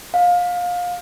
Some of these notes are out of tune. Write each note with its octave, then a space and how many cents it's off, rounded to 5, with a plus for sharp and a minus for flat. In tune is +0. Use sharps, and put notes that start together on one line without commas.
F5 +25